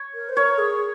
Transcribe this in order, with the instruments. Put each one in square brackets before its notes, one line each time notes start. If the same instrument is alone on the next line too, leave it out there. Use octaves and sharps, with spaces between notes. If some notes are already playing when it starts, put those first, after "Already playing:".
Already playing: [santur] C#5
[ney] A#4
C5
[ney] A#4 [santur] C#5
[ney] G#4